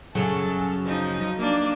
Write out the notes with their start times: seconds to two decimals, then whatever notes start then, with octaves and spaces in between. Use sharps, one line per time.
0.15 F#2 C#3 F#3 A4
0.84 F3 D#4
1.38 A#3 D4